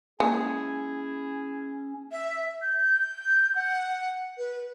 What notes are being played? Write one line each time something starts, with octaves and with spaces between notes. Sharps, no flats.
G#3 A#3 C#4 E4 G#4
E5
G6
F#5
B4